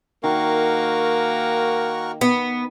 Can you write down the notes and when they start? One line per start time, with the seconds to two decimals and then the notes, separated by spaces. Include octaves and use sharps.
0.24 D#3 A#3 F#4 A#4 C#6
2.21 B3